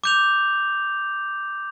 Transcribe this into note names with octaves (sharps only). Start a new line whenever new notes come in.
D6 G6 F7